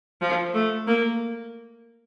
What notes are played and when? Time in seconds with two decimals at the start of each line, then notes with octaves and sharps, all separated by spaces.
0.21 F3
0.54 A3
0.87 A#3